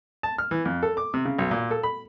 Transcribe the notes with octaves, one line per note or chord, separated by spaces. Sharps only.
A5
F6
E3
F2
A4
D6
C3
C#3
B1
A#2
A4
B5